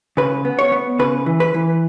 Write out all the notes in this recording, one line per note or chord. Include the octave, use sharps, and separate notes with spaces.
C#3 B4
B3
C#5
B3
C#3 B4
E3
B4
E3